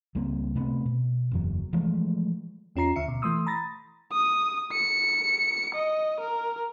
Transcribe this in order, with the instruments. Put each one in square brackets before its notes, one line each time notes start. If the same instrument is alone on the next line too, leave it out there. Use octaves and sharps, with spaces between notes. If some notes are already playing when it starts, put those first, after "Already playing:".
[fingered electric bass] C#2 G3 A#3 C4
C3 A3 B3 C4
B2
F#1 E2 F#3
E3 F3 G#3 A3
[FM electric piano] E2 C#4 F4 A#5 C7
D2 D3 E5 C#7
B2
E3 A3 C6 D#6 E6
A#5 B5 D#6 A6 A#6
[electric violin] D#6
C#7
D#5
A#4